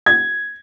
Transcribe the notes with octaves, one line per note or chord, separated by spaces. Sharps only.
G#6